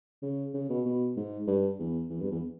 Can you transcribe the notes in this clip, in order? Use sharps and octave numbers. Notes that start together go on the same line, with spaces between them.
C#3
C#3
B2
B2
G#2
G2
E2
E2
G2
E2